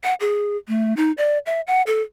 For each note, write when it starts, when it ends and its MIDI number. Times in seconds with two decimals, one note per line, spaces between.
0.04 0.14 78
0.20 0.57 68
0.68 0.94 57
0.97 1.12 63
1.18 1.38 74
1.46 1.61 76
1.67 1.82 78
1.87 2.02 69